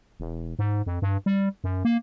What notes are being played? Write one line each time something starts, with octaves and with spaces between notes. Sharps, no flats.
E1
G#2
F2
G2
G3
F#2
A#3